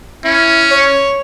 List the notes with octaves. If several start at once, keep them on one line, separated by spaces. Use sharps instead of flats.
C#4 E4
C#5